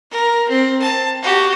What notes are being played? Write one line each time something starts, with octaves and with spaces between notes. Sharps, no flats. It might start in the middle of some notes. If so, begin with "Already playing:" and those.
A#4
C4
A5
F#4 G4